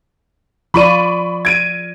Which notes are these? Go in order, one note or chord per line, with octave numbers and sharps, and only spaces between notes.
F3 F4 D5 B5 C#6 D#7
G#6 D7 D#7